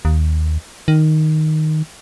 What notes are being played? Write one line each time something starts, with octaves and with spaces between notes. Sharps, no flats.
D#2
D#3